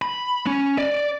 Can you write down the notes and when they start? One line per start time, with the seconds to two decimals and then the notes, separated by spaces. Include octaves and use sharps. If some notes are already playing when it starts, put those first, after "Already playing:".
0.02 B5
0.47 C#4
0.78 D5